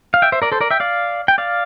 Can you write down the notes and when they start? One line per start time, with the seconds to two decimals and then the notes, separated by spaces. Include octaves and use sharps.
0.14 F5
0.22 E5 G5
0.32 C5 E5
0.42 A#4 D5
0.52 A4 C5
0.61 A#4 D5
0.71 E5 G5
0.80 D5 F5
1.28 G5
1.38 D5 F5